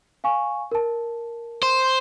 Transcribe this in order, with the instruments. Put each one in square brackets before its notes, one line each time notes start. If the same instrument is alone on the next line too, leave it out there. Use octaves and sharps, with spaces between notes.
[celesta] F5 G#5 C#6
A#4 A5
[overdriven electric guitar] C5